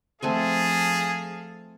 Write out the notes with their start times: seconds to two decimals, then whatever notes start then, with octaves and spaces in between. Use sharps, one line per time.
0.22 F3 A3 C4 G#4 A4 F5 G#5